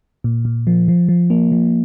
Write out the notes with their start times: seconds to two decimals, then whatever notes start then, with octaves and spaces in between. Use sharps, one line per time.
0.24 A#2
0.45 A#2
0.67 F3
0.88 F3
1.09 F3
1.30 A#3
1.52 F3